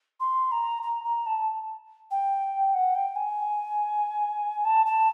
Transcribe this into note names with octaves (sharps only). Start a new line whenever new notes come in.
C6
A#5
A#5
A#5
A5
G5
F#5
G5
G#5
A5
A5